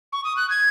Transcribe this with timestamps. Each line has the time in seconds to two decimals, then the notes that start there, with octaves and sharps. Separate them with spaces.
0.13 C#6
0.24 D#6
0.37 F#6
0.50 G#6